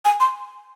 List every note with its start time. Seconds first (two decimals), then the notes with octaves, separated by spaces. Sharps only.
0.05 G#5
0.20 C6